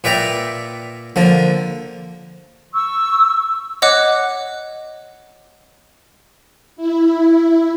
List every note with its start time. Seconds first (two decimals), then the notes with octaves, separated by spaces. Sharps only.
0.04 A#2 B4 D5 E5 G5 A#5
1.16 D3 F3 A#3
2.73 C#6 E6
3.82 C#5 D#5 F#5 D6 F#6
6.76 E4